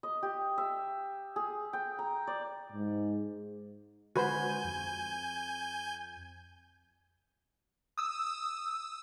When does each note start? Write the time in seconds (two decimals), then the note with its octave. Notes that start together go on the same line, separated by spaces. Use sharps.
0.03 D#5
0.23 G4
0.58 E5
1.36 G#4
1.73 G5
1.99 A#5
2.27 D5
2.72 G#2
4.16 D3 D#3 G#3 F#4 B4 C5 G#5 G6
4.65 F2
7.98 D#6 E6